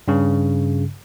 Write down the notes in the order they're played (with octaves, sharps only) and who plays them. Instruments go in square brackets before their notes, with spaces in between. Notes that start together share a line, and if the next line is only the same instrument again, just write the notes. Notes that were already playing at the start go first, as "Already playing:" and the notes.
[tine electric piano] G2 C#3